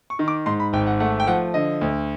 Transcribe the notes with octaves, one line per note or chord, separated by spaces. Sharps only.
C#6
D#3
D6
G#2 C6
B5
G#1 G5
F#5
A3 F#5
G5
F3 F#5
D3 D#5
D2